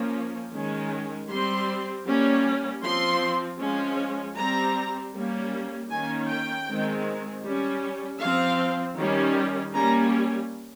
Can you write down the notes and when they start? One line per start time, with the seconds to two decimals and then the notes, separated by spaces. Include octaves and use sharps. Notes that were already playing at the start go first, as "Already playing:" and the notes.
Already playing: F3 A#3 C#4
0.53 D#3 G#3 C#4
1.30 G3 C4 C6
2.06 G3 A#3 C#4
2.83 F3 C4 C6
3.60 F3 G#3 C#4
4.37 G3 C4 A#5
5.13 G3 A#3 C#4
5.90 D#3 A#3 C#4 G#5
6.28 G5
6.67 D#3 G#3 C4
7.43 G3 C#4
8.20 F3 C4 F5
8.97 D#3 G3 C#4
9.73 G3 A#3 C#4 A#5